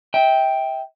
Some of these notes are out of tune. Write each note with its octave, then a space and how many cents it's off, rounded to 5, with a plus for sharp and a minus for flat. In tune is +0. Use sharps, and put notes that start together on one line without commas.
E5 -35 G5 +0